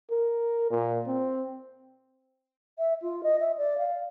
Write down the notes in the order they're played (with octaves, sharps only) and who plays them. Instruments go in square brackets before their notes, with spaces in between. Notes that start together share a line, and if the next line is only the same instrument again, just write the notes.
[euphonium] A#4
A#2
C4
[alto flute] E5
F4
D#5
E5
D5
F5